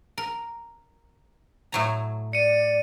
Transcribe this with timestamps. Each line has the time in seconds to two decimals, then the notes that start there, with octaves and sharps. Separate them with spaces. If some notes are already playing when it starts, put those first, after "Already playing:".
0.18 A#4
1.72 A2 F#3 A#5
2.33 D5 C#7 D#7